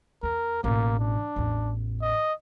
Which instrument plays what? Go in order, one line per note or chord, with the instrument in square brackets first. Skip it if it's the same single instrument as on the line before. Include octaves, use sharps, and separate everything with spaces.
[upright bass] E2 [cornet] A#4
[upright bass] A1 B2 [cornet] A#3
[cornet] D4
[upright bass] A1 E2
[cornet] D#5